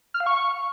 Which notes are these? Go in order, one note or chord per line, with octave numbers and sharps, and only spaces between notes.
F6
F5
C#6